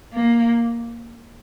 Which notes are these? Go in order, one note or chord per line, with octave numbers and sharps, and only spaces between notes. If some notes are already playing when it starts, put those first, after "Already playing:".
A#3